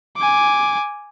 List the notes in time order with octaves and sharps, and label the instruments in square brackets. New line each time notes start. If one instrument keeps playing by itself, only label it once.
[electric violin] G#5 D6